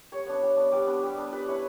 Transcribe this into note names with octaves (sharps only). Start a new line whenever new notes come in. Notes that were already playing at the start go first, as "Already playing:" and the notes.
G3 C#5
B3 D4
G3
B3 D4
G3 D5
B3 D4
G3
B3 D4
G3 B4
C#4 E4 C#5